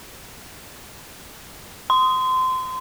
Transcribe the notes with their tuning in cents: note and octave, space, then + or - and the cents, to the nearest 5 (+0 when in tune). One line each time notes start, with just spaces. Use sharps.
C6 -25